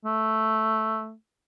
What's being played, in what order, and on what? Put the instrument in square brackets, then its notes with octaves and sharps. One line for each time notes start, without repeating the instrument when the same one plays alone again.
[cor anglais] A3